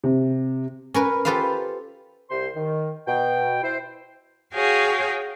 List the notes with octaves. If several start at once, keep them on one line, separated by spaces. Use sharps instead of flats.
C3
C#4 A#4 B4
F4 G4 A4 B4 C5 F5
C2 C3 C5 C6
D#3
B2 G5
E4 C5
F#4 G#4 C#5 F5 G5